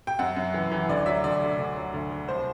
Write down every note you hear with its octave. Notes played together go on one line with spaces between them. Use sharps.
G5
F#2 F#5
F#2
E3
E3
D2 D5
F#3 E5
D2 D5
D3
D2
F#3
D2
D3
C2 C5